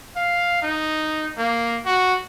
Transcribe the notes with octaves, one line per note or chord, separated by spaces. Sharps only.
F5
D#4
A#3
F#4